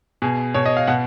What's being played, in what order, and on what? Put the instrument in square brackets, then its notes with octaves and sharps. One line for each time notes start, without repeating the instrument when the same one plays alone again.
[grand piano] B2 G#4
B2 C#5
D#5
F5
B2 F#5